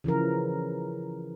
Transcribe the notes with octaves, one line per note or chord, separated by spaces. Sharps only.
C#3 E3 F3 A#4